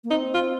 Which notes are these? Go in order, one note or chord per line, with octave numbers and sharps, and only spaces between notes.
A#3
C4 D#4
F4